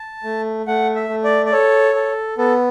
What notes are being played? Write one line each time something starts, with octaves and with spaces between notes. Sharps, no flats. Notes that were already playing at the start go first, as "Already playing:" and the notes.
Already playing: A5
A3
A3 F#5
E5
A3
D5
D5
A4 C#5
A4
B3 A4